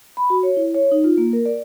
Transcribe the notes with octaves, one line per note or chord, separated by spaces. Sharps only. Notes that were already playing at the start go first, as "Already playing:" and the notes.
B5
F#4
C#5
E4
C#5
D#4
F4
A#3
A#4
D5